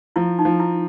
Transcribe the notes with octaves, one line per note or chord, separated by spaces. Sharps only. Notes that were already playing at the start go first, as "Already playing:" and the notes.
F3 E4
D#4
F3
E4